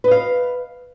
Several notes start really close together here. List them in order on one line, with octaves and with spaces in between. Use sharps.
B4 D#5 F5